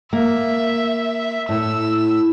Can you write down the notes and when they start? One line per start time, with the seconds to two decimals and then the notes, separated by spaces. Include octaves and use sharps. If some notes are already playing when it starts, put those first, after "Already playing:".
0.13 A#3 E5
1.49 A2 E6